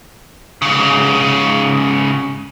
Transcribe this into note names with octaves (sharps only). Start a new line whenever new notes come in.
G#2 C#3